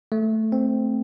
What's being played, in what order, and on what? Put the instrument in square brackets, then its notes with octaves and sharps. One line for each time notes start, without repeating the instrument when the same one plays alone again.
[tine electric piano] A3
C4